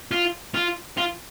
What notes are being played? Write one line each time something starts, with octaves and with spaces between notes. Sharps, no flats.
F4
F4
F4